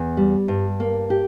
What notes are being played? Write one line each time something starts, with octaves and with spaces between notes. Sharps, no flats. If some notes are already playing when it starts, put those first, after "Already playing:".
Already playing: E2
G3
G2
A#3
G4